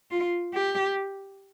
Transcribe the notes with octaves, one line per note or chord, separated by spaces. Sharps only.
F4
G4